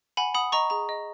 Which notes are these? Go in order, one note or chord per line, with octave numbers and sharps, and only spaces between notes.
F#5 G#5 B5
F#5 B5 D#6
D#5 A#5 C#6
G#4 A#5
D#5